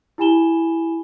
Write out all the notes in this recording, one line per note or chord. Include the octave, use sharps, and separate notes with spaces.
E4 G4 G#5 B5 E7 G7